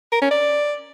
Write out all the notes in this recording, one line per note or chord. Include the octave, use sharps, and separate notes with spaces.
A#4
C#4
D5